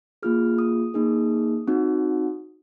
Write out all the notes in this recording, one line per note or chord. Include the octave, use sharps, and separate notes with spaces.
A#3 F4 G#4 F6
D#6
A#3 D#4 G#4
C4 D#4 F#4